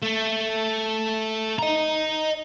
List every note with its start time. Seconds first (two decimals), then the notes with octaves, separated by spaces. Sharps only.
0.02 A3
1.59 D#5 A#5